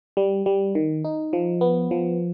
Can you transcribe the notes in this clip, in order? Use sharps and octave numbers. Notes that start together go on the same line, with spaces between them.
G3
G3
D#3
D#4
F3
B3
F3